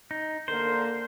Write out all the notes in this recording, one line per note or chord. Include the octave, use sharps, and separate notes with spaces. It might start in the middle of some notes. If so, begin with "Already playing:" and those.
D#4
D3 A#3 A#4 C5